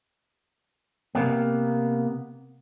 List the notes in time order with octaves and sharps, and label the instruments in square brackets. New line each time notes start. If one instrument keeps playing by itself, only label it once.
[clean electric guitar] C3 A#3 B3